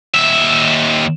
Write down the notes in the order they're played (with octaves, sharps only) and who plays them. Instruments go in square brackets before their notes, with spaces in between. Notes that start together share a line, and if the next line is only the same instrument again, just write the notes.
[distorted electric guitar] D#2 E5